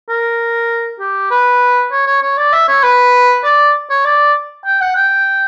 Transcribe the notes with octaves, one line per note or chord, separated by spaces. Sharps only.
A#4
G4
B4
C#5
C#5
C#5
D5
E5
C#5
B4
D5
C#5
D5
G5
F#5
G5